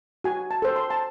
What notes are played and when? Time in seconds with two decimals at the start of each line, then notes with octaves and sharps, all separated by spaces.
0.24 F#4 G#5
0.51 A5
0.62 A4 C5
0.76 C6
0.90 A5